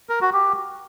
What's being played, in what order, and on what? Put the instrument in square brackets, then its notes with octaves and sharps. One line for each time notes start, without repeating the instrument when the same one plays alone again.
[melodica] A#4
F#4
G4